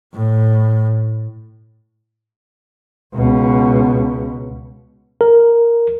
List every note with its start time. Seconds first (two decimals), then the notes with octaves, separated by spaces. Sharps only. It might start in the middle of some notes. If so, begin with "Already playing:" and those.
0.14 A2
3.15 C#2 B2
5.21 A#4